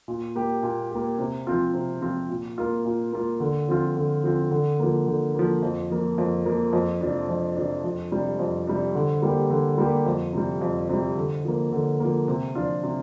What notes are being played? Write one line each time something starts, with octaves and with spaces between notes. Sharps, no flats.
A#2
A#3 G4
A#2
A#3 G4
C3
F3 C4 F4
C3
F3 C4 F4
A#2
A#3 F4
A#2
A#3 F4
D3
F3 C4 F4
D3
F3 C4 F4
D3
F3 A#3
D3
F3 A#3
F2
F3 A#3
F2
F3 A#3
F2
C3 F3 D4
F2
C3 F3 D4
F2
C3 G3 D4
F2
C3 G3 D4
D3
G3 A#3 G4
D3
G3 A#3 G4
F2
C3 G3
F2
C3 G3
D3
F3 A#3
D3
F3 A#3
C3
F3 D4 F4
C3